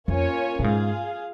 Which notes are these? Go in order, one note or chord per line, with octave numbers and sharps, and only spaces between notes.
F2 A#3 C#4 F4 C#5 G#5
A#2
G#2 F4 G#4 F5